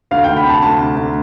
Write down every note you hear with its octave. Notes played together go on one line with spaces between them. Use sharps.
D2 F5
D2 G5
B5
C3 A5
D2 A5
C3
D2